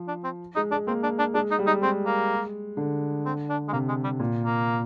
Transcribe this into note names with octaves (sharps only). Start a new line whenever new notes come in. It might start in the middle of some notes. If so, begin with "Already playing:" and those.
Already playing: F3
D4
C4
G#3 D#4
G#3 D4
A#3 C4
D4
D4
G#3 D4
D#4
G3
D#4
G#3 C4
A#3
D3
C4
D4
G#3
C3 A#3
G#3
G3
A#2
A#3